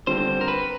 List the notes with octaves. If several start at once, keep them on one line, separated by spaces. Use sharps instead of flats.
D3 G3 C4 C5
A#4
B4